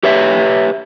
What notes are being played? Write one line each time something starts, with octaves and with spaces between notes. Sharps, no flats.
G4 B4 C#5 E5